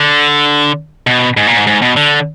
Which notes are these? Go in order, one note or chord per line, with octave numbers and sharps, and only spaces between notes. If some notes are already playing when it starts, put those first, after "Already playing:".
Already playing: D3
B2
G#2
A#2
G#2
G#2
B2
D3